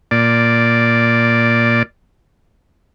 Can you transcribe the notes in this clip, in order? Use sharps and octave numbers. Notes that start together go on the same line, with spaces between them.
A#2 D5